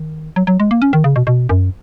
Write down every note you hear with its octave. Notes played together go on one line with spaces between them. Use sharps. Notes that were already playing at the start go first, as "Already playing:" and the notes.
Already playing: D#3
F#3
F#3
G#3
A#3
C#4
D#3
C#3
B2
B2
F#2